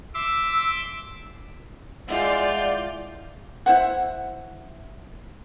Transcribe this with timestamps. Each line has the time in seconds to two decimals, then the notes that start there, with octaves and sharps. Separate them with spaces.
0.14 E5 C6 D6 E6
2.08 G#3 E4 F4 D5 E5 F#5 G6
3.66 E4 C5 F#5